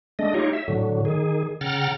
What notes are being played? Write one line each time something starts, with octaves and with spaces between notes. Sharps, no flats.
G#3 A3 D4 D#5
D#4 F4 G4 C#5
E5
A2 D3 F#3
D#3 G#4
C#3 F#5 G5 A#5 F6 A6